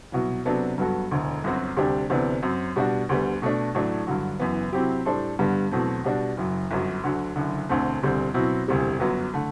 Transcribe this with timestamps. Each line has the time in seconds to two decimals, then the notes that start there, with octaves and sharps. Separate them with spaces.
0.12 C2 B2 F#3 B3
0.45 C3 F#3 B3 D4 A4
0.78 G2 F#3 B3 F#4 A4
1.11 E1 D2 D3
1.44 G1 F#2 F#3 C4 F#4
1.76 D2 C3 G3 D4 G4
2.10 D2 C3 E3 B3 D4
2.42 F#2 F#3 C4
2.76 B2 G3 D4 F#4
3.09 D2 D3 G3 B3
3.42 B2 A3 D4
3.75 A1 A2 F#3 A3 D4
4.07 G2 D3 F#3
4.39 F#1 F#2 E3 B3
4.73 C3 F#3 C4 E4 G4
5.05 A2 G3 D4 A4 C5
5.39 G2 D3 G3 B3
5.71 E2 B2 F#3 A3 C4
6.04 B2 G3 D4 F#4
6.37 F#1 F#2 F#3
6.71 G1 F#2 F#3
7.03 D2 D3 F#3
7.36 F#1 F#2 D3
7.69 E1 D2 D3 A3 C4
8.02 E1 D2 D3 G3 C4
8.34 B2 F#3 C4 E4
8.68 E1 D2 C3 G3
9.00 G1 F#2 F#3 B3
9.34 D3 A3